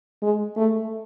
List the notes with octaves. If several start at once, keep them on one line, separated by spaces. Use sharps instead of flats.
G#3
A3